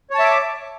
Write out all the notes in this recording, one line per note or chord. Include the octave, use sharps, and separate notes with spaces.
C#5 E5 A5 D6